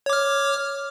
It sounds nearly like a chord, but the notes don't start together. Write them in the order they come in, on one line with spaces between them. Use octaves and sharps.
C#5 D6 F6